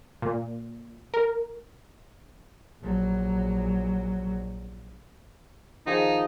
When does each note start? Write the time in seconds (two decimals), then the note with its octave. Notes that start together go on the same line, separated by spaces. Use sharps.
0.22 A#2
1.14 A#4
2.82 A#1 F#3
5.86 D#3 F3 D#4 G#4